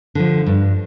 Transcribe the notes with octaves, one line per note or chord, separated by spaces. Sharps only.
D3 F3
G2